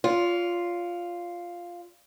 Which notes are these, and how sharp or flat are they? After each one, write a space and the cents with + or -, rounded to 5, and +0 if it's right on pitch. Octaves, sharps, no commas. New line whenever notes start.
F4 +0 C#5 +45